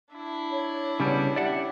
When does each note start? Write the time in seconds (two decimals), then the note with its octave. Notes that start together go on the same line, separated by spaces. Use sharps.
0.11 D4 E4
0.51 C#5
1.00 C#3 G3 B3
1.36 G4 D5 E5 F#5